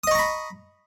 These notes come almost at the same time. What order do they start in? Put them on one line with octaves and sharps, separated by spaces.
D#6 D#5 C#6 A#5 B5